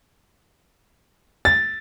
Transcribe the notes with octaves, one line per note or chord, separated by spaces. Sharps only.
A6